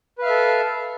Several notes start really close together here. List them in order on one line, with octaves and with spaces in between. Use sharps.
B4 F5 E5 A4